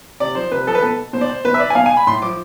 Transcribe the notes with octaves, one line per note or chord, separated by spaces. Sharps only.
C3 D5
F3 C5
C3 B4
F3 A4
B4
B2 A4
B2 C5
D5
C5
B2 B4
E5
D5
G#5
B2 F5
G#5
B5
A2 C6
F3 D6